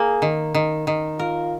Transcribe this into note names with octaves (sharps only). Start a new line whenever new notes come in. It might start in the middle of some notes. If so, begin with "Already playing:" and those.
Already playing: A#3 G#4
D#3
D#3
D#3
F4 A#4